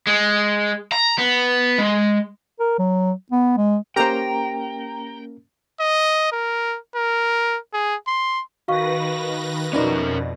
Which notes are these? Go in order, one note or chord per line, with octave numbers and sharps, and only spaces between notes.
G#3
A#5
B3
G#3
A#4
F#3
B3
G#3
A#3 C#4 G4 A#4 C5 G5 A#5
D#5
A#4
A#4
G#4
C6
D#3 F#4 B4 F5 C#6 A#6
F2 B2 C#4 D#4 A#4 B4 D5